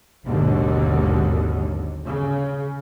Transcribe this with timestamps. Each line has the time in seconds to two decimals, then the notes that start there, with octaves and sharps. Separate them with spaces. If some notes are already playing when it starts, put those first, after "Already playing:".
0.25 G#1 D#2 G#2 B2 D3 F#3
2.05 C#3